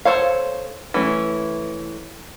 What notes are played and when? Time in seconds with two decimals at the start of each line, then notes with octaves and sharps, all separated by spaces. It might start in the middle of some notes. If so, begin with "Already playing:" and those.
0.05 A4 A#4 C5 C#5 F5
0.94 E3 A3 C#4